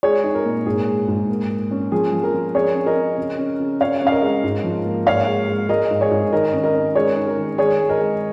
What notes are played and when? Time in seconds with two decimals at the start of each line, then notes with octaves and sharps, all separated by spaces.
0.03 G#3 G#4 C#5
0.24 D#4
0.35 A#4
0.45 A#2
0.66 G#2 G#4
0.87 G#3
1.08 G#2
1.29 A#3
1.50 A#3
1.71 C#4
1.92 F3 G#4
2.13 F3
2.23 A#4
2.34 F3
2.55 C#4 G#4 C#5
2.75 C#4
2.86 A#4 D#5
2.97 C#4
3.18 C#3
3.39 C#4
3.60 C#3
3.81 C#4 C#5 F5
4.02 C#4 F5
4.12 A#4 D#5
4.22 G#3
4.44 G#2
4.64 F3
4.85 A#3
5.06 G#2 C#5 F5
5.28 G#3
5.48 G#3
5.69 G#3 A#4 D#5
5.90 G#2
6.01 G#4 C#5
6.11 G#2
6.32 D#3 A#4 D#5
6.53 C#4
6.63 A#4 D#5
6.74 C#4
6.95 G#3 G#4 C#5
7.17 D#4
7.27 A#4
7.37 D#3
7.58 G#3 G#4 C#5
7.79 G#3
7.89 A#4 D#5
8.00 G#3